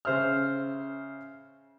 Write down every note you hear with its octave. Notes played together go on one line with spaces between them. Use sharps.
C#3 C5 E5 F6